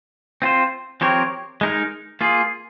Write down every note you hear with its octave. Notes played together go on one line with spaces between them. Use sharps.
C4 F4 C5
F3 C4 G4 A#4 C#5
G#3 D#4 A#4
A#3 F4 G#4